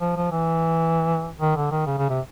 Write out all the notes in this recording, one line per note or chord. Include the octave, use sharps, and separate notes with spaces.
F3
F3
E3
D#3
D3
D#3
C#3
C#3
C3